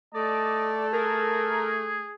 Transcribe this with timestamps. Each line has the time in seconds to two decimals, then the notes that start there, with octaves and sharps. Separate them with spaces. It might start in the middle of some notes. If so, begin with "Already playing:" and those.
0.14 A3 D5 D#5 A5
0.93 G#4 A#4